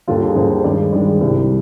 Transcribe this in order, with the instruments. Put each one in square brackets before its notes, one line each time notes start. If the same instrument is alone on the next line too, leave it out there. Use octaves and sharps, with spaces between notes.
[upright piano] D#2 D3 G3 F4
G#4
D#2 D3 G3 C5
C5
G2 D#3 G#3 D5
G2 D#3 G#3 D5
C2 C3 G3